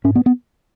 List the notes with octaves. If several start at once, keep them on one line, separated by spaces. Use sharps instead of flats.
G#2 C#4
B3
B3